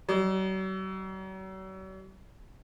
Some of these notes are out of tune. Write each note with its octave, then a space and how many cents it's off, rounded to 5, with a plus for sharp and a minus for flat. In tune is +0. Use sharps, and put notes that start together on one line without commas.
F#3 +45 D#5 -30